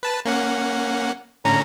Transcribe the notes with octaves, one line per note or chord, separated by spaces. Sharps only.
B4 A5
A#3 C#4 F#5
A2 D3 C#4 A#5